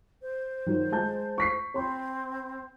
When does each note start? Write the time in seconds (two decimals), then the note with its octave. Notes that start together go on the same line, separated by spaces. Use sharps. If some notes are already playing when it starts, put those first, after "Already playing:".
0.22 C5
0.66 D#3 F#3
0.92 G#3 A5 G6
1.38 C#6 B6 C7
1.74 C4 C5 B5 C6